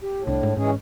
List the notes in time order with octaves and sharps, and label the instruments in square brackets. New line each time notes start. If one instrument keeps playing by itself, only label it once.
[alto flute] G4
[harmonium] A2
[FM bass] C2 [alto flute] D4
[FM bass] G#2
[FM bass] G#2 [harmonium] E3 G#3 G#4 [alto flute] C#4